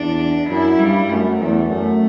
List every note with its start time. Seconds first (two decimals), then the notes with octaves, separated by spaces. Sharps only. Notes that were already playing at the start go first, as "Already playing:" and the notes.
Already playing: E2 D4
0.49 F#2 E4
0.79 G2 G3
1.10 F#2 A3
1.40 E2 A3
1.69 F#2 A3